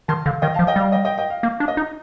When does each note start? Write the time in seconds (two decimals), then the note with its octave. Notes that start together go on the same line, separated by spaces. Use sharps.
0.08 D#3 A5 C6
0.26 D3 F5
0.42 D#3 D#5 G5
0.54 F3 F5 A5
0.67 D#5 G5
0.76 G3 F5
0.92 D#5 G5
1.05 D#5 G5
1.18 D#5 G5
1.30 F5
1.43 A#3 F5
1.60 D4
1.68 D#5
1.77 D#4